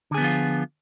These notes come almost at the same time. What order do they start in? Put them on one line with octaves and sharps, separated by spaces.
D3 G#4 B3 F3 F4